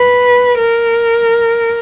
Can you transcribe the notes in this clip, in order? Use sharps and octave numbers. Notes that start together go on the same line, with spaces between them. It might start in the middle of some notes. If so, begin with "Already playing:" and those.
Already playing: B4
A#4